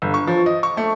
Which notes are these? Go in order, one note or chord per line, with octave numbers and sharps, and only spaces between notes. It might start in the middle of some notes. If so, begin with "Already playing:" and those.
G1
C#6
F3
D#5
C#6
A3